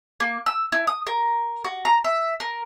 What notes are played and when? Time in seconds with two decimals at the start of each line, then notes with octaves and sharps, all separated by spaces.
0.20 A#3
0.46 E6
0.72 E4
0.87 D#6
1.07 A#4
1.64 F#4
1.85 A#5
2.04 E5
2.40 A#4